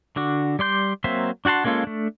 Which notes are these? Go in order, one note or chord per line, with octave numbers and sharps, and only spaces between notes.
D3 D4 F#4
G3 D5 C6 G6
F#3 A#3 C4 C5 E5
D4 F#4 F#5 A5 C6
G#3 A#3 C#4 F4 A4
A3 D4